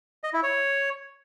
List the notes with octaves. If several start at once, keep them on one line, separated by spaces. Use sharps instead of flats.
D#5
E4
C#5